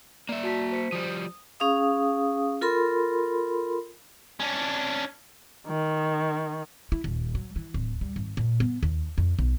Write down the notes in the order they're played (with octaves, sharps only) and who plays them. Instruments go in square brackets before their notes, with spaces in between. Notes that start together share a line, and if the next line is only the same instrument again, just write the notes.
[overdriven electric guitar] A#3 E5 [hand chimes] D5
[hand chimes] F#4 A5 B6
C5 B6 C#7
[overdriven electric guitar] F3 G3 [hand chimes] D#6
[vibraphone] C#4 G#4 F5 D#6
F4 A4 A#4 B5 C6
[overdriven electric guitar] C#4 D4
[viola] D#3
[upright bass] E4
D#1
F#3
E3
D1
G3
G#1
A#2
B3
D#2
F2
B1